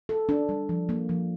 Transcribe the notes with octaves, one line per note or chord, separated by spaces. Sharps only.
A4
D4
G3
F3
A#3
F3